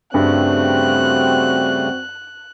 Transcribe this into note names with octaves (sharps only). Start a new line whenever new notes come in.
G2 C#3 G3 A3 C4 F#4 F#6